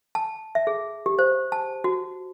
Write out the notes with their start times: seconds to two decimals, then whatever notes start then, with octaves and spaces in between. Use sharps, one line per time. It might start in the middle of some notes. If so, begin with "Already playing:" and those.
0.15 A5
0.55 E5
0.67 G#4
1.06 G4
1.19 C5
1.52 A5
1.84 F#4